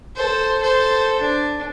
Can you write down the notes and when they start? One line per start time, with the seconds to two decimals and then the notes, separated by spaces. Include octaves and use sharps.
0.16 A4 C5
0.62 A4 C5
1.22 D4